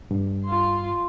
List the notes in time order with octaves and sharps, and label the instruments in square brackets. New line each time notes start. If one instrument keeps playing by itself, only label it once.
[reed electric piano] G2
[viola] F4 C6